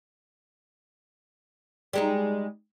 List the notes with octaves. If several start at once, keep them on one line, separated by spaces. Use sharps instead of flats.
G3 G#3 D#4